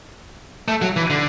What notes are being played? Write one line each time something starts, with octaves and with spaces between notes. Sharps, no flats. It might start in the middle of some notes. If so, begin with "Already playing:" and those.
A3
F#3
E3
D3